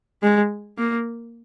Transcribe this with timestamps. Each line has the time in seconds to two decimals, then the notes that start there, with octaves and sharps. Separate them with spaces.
0.23 G#3
0.78 A#3